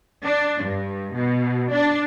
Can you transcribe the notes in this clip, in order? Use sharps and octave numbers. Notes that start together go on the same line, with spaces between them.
D4
G2
B2
D4